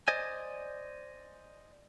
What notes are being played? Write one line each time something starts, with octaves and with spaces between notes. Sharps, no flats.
C5 D5 D#5 G#5